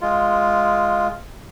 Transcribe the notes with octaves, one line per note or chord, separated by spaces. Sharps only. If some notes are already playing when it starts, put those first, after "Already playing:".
G#3 F4